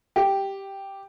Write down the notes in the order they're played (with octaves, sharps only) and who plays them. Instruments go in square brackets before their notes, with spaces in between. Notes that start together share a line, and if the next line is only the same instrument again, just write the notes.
[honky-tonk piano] G4